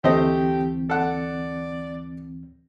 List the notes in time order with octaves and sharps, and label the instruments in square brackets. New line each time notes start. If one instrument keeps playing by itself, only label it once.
[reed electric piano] D2 E3 C4 [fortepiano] A3 C5 D#5 [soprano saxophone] G4
[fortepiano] A4 F#5 [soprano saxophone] D5